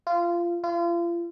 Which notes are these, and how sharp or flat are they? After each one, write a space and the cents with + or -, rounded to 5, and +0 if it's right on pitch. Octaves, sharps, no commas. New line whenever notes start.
F4 -20
F4 -35